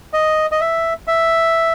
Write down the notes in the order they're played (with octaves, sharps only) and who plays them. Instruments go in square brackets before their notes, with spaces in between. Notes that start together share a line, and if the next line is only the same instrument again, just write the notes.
[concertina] D#5
D#5
E5
E5